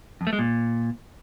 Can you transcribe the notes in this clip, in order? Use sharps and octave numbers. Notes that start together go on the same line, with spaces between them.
F2
A3
G#3
A#2